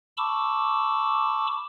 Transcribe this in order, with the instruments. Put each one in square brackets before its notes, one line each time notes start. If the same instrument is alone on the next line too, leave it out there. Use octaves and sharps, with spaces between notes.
[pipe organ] A5 B5 C#6 D6 E6